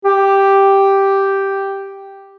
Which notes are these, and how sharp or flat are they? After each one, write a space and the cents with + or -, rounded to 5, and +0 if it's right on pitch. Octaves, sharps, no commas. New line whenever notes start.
G4 +0